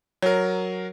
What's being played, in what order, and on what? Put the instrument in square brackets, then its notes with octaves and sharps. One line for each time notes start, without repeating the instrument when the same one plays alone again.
[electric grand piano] F#3 A#4 [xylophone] C#5